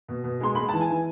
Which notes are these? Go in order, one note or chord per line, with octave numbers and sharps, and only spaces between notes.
B2
B2
G#3 C6
G#3 B5
E3 A5
G#5
E3